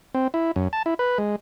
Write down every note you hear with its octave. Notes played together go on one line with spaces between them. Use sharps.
C4
E4
F#2
A5
E4
B4
G#3